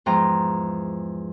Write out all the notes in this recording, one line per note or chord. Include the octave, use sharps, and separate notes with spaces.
E2 G#2 F3 C5 G5 A#5